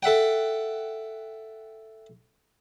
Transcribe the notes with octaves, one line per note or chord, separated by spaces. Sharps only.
A4 E5 F#5 G5